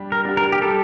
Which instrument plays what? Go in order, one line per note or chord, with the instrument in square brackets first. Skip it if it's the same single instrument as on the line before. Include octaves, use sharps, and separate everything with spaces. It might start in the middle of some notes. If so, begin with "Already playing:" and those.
Already playing: [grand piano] G3 D4 G4
[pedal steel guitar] A#4
[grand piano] D4 G4
[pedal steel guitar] A#4
G4
[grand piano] G3 [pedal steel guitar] A4